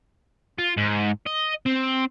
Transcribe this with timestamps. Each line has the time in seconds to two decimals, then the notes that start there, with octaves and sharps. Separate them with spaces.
0.58 F4
0.77 G#2
1.27 D#5
1.66 C4